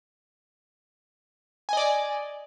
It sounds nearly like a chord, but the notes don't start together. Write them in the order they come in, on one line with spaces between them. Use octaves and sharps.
G#5 D#5 D5